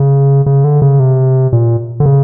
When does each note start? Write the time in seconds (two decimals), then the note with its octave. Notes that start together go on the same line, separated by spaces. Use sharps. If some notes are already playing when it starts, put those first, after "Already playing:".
Already playing: C#3
0.46 C#3
0.64 D3
0.82 C#3
1.00 C3
1.53 A#2
2.00 D3
2.06 C#3